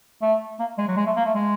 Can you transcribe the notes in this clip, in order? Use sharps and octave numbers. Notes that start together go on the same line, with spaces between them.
A3
A#3
G#3
F#3
G#3
A3
A#3
A3
G#3